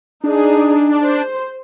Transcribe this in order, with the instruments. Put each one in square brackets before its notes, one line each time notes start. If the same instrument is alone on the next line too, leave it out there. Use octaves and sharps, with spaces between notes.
[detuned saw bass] D4 [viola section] D#4 G#4
[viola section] C5